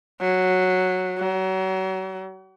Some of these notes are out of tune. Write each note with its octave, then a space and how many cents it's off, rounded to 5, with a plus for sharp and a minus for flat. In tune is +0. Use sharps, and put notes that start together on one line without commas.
F#3 -5
F#3 +35